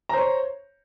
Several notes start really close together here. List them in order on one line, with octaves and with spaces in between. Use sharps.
A#5 C5 C#5